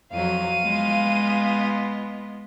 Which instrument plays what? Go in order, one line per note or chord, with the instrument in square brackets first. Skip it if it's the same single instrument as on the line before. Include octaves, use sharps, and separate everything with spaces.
[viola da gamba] F2 F#3 [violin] F5 D#7
[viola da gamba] G#3 B3 F4